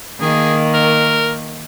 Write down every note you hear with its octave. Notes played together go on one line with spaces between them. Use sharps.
D#3 A#3 G#4
A#4